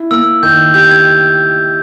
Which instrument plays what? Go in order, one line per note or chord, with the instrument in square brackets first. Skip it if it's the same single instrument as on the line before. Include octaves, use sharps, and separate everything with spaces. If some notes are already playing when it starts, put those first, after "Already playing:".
Already playing: [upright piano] E4
[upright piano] A#3 [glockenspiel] E6
[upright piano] D#3 [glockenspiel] G6
[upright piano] G4 [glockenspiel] G6
[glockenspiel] G#6